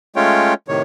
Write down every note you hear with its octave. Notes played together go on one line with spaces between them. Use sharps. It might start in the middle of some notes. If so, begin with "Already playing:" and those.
G#3 A3 C#4 F4 C#5 G5
A2 C3 D#3 C#5